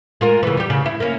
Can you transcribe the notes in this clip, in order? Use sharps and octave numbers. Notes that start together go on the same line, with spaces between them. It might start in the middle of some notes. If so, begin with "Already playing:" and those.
G#3 F4 A#4
C#3 E3
G3 G4
C#3
E4
A#3 C#4